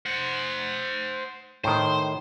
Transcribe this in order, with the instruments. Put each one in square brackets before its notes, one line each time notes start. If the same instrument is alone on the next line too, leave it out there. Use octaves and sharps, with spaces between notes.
[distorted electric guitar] C5 F#5
[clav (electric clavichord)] A2 D#3 [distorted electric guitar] C5